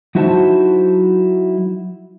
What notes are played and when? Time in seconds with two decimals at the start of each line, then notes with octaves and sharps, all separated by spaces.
0.15 F#3 D#4 E4 F#4 C5 A5